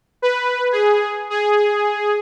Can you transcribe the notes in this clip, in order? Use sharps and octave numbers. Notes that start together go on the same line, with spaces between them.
B4
G#4
G#4